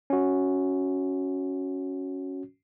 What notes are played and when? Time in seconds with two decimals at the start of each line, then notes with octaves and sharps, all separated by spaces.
0.10 C#4 F#4